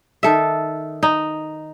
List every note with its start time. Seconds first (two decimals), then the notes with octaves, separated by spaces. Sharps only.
0.23 D#3 A4 E5
1.03 D#4